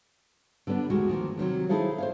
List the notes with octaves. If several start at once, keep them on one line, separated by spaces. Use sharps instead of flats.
D3 G3 B3 D4
D2 D#3 G#3 F#4
D#3 F3 A#3
C3 D#3 F3 F#3
D#4 E4 G#4 A4 C5 F5
C5 C#5 F5